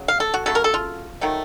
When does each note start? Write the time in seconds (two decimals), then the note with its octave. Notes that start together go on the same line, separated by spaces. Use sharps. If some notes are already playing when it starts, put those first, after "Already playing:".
Already playing: C#3 F#3
0.08 F5
0.20 A4
0.34 F#4
0.46 C#3 F#3 A3 A4
0.55 A#4
0.64 A4
0.74 F4
1.21 D#3 F#3 A3